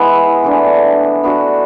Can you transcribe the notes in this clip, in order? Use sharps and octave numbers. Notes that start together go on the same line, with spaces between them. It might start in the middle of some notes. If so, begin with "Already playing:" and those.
Already playing: G#3 B3 E4
E3 A3 D4
B3 D4 F#4 A4